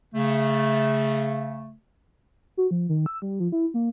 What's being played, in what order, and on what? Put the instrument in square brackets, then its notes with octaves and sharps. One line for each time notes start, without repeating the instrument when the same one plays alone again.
[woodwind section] C#3 A3
[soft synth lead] F#4
F3
D#3
E6
G3
F3
E4
A#3